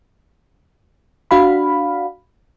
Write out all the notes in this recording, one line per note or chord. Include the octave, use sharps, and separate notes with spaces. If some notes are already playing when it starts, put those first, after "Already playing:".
D4 F#4 F5 B5